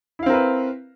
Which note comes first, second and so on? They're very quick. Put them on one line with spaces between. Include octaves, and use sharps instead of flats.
E4 F5 C4 A#4 B4